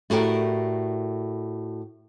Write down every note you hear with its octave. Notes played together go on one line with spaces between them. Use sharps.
A2 F#4 G4 A#4 D5